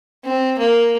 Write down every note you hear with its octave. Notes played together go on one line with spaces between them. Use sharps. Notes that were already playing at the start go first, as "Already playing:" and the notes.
C4
A#3